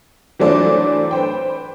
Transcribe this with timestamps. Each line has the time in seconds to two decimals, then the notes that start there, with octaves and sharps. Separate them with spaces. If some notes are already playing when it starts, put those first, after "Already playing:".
0.39 E3 F#3 A3 D4 C5
1.11 B4 C5 G5